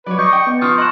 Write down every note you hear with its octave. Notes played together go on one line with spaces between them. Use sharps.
F#3 B4 C#5 D5
D#5 C#6 G6 C#7
G5
B3
F3 F4 A5 C#6 D#6 F6
D#5 B5 C#6 F#6 E7